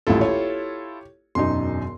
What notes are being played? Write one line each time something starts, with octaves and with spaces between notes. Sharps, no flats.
D#1 A1 E4 F4 A4
G4 C#5
E1 F#2 D#4 C6